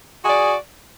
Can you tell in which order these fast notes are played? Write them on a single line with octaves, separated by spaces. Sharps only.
F#4 G#4 D5